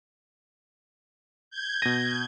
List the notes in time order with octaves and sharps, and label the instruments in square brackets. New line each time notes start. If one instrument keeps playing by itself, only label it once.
[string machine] G6 G#6
[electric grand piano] B2 D#7 [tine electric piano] A#6